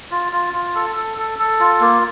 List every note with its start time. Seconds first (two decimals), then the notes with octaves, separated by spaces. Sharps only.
0.11 F4
0.32 F4
0.54 F4
0.75 A4
0.96 A4
1.18 A4
1.39 A4
1.60 F4
1.81 A#3